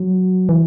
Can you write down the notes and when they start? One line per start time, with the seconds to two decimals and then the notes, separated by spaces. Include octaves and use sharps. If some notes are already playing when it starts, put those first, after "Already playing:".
Already playing: F#3
0.49 E3